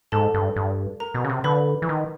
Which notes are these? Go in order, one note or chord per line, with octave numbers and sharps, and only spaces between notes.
G#2 A4 A5
G2
G2
A#4 A#5
B2
C#3
C3
D3 B4 B5
E3
D#3